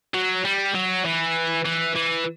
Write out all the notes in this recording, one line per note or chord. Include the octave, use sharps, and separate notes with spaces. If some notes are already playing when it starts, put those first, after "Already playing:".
F#3
G3
F#3
E3
E3
E3